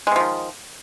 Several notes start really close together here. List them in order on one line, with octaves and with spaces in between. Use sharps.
G#3 C3 F3 D#3